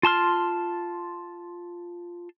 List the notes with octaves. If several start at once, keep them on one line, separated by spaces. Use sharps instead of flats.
F4 A5 C6 F6